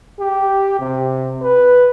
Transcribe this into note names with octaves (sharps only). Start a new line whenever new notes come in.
G4
C3
B4